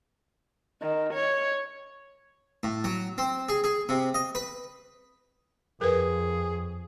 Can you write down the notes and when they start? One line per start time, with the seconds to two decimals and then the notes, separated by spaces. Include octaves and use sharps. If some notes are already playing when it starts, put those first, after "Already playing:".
0.82 D#3
1.13 C#5
2.63 A2
2.84 F#3
3.18 C4
3.49 G#4
3.64 G#4
3.89 C3
4.14 D#5
4.35 B4
5.81 F2 G#4 A#4 B4